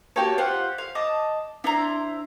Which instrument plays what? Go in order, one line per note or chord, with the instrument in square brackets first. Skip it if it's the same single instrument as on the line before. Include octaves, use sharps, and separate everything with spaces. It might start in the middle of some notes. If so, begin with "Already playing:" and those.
[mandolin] A#3 A5 C#6 [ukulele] F#4 G4 C#5
[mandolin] F4 G4 F#5 [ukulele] C5
[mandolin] F5
D#5 A5 D6
[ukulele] D4 [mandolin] E4 C5 A#5